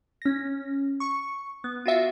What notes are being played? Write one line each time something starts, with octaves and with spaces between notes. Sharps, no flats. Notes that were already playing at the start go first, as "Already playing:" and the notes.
C#4 A#6
C#6 C#7
B3
F4 F#4 E5 F5